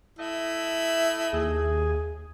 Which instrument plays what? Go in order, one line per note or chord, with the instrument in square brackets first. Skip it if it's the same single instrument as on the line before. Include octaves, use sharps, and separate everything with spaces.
[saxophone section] A3 D#5 E5 [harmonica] E4
[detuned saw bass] D#2 [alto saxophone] G#4